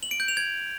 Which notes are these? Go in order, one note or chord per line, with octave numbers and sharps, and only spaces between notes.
F#7
D7
G6
F7
G#6